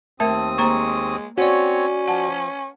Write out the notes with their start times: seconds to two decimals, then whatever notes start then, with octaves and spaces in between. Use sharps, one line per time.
0.20 D#2 A3 C4 A#4 E5 A5 D#6
0.58 G#3 A#3 C5 A#5 C#6
1.38 C4 C#4 F#4 C#5 D5 F#5
2.08 F3 F#5 A5